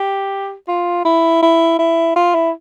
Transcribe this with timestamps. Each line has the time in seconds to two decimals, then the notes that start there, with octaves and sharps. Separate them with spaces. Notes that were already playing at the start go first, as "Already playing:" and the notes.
Already playing: G4
0.68 F4
1.05 E4
1.43 E4
1.79 E4
2.16 F4
2.34 E4